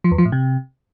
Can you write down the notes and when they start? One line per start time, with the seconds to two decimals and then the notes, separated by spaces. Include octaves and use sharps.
0.04 F3
0.11 E2
0.18 F3
0.25 A2
0.32 C3